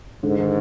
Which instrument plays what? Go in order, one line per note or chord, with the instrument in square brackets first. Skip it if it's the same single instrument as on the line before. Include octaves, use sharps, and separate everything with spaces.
[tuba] G#2 [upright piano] D3
[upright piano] D#3